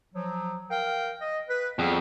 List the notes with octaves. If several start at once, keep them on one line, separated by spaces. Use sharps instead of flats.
F3 F#3
A#4 F5 G5
D#5
B4
F2 G3 B3 G#4